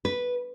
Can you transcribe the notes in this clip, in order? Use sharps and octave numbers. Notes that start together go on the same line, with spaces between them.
B4